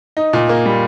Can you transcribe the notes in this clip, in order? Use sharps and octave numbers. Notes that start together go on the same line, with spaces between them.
D#4
A#2
A#3
G3